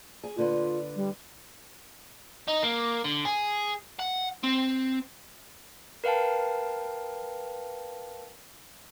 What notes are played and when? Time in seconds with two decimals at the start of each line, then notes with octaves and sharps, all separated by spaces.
0.23 G#4
0.37 A#2 D3 F4 B4
0.96 G3
2.48 D#4
2.63 A#3
3.04 D3
3.25 G#4
3.99 F#5
4.43 C4
6.04 A#4 B4 F5 G5 A5